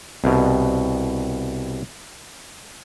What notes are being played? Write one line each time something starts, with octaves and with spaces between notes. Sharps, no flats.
C2 B2